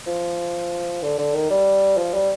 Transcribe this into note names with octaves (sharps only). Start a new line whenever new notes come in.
F3
D3
D3
D#3
G3
F3
G3